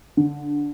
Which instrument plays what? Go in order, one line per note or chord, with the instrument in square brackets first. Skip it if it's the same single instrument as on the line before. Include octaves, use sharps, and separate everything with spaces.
[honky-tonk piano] D3